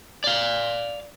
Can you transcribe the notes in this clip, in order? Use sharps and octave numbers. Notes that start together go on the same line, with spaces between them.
D5 F5